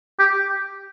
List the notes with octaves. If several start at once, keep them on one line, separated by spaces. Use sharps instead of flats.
G4